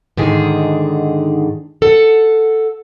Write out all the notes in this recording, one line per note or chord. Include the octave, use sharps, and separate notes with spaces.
G#2 D3 D#3 G#4
A4 F#5